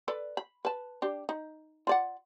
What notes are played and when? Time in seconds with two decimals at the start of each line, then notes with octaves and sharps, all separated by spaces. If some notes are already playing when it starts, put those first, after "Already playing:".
0.08 A4 B4 D5
0.37 B5
0.65 B4 A5
1.02 D4 G4
1.29 D#4
1.87 F4 D5 F#5